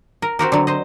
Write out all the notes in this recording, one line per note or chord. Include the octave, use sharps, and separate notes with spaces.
A#4
C4 F#4 G4 A#4
D3 F#3
C5 D#5